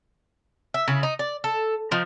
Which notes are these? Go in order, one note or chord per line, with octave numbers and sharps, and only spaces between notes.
E5
C#3 E4
D#4
D5
A4
F3 D#4